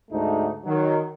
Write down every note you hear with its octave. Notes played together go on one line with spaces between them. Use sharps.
D2 G#2 A3 D#4
D#3 F#3